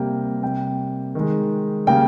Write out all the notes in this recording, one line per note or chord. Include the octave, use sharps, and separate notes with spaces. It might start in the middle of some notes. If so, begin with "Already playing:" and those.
Already playing: C3 G3 A#3 G5
C3 G3 A#3 G5
D#3 G#3
C#3 G3 A#3 G5